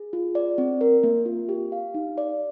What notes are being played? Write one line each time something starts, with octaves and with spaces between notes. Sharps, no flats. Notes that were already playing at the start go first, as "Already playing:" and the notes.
Already playing: G#4
F4
D5
C4
A#4
A#3
F4
G4
F5
D#4
D5